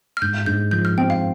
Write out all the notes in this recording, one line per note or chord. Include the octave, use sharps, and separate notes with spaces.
F6
G#2 G6
G#2 G6
F3 G6
F6
C4 G5
F5